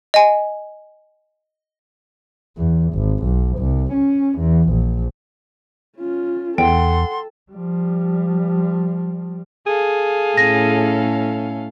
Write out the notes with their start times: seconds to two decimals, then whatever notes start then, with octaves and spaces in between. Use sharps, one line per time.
0.14 D#5 G#5
2.57 E2
2.94 G#1
3.24 B1
3.58 C2
3.93 C#4
4.39 E2
4.70 A#1
5.98 C#4 F4
6.58 E2 A4 F#5 G5 C6
7.52 F3 G3
9.67 G#4 A4 F5
10.37 A2 C#4 A#6